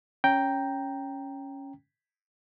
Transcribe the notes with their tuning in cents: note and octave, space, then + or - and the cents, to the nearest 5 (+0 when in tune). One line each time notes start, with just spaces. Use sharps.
C#4 +0 G5 +0 A#5 +0